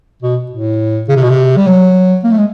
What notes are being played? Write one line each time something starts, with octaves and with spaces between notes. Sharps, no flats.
B2
A2
C#3
C3
B2
C3
G3
F#3
A#3
A3
G#3